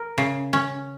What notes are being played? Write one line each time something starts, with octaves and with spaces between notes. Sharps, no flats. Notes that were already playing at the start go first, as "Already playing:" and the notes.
Already playing: A#4
C#3
C#4